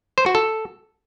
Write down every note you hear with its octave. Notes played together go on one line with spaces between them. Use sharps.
C5
F#4
A4